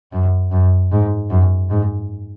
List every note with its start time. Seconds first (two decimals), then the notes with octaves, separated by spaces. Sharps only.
0.13 F#2
0.52 F#2
0.92 G#2
1.30 F#2
1.70 G#2